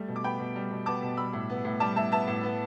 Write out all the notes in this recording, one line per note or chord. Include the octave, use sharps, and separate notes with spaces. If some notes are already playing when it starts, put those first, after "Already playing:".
Already playing: G3 A3
B2
D6
B3 G5 B5
B2
G3
B2
B3 A5 D6
B2
G3 B5 E6
A2
B3
A2
G3 A5 D6
A2 E5 A5
B3 E5 A5
A2
B3